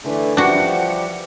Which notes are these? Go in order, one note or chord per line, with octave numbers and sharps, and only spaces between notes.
D3 E3 A3 D4 B4
F3 G3 D4 E4 F#4 G4 F#5